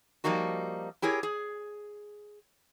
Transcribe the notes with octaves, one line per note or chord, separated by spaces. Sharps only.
F3 G3 A#3 D#4 F#4
E4 G4 G#4 A#4 C#5
G#4